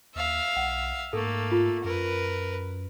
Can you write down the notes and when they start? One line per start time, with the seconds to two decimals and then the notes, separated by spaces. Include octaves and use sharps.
0.15 D#2 E5 F5
0.56 B1 F#5
1.13 G#2 A3 A#3 A4
1.51 F4
1.84 F#2 A#4 B4